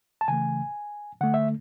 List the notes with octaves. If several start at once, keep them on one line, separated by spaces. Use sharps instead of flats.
A5
C#3 E3 A3 G#5
D3 A3 F#5
E5